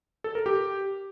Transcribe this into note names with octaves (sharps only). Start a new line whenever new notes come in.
A4
A#4
G4